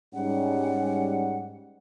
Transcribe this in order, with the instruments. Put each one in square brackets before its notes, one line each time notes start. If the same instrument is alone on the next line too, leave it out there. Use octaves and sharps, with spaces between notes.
[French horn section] G#2 G3 C#4 [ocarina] F#5